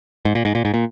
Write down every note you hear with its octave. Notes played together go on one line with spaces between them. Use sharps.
G#2
A#2
G#2
A#2
G#2
A#2